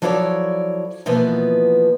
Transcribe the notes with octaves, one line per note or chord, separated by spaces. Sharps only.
F3 F#3 E4 A4 C#5 D5
B2 E3 F3 A#3 B3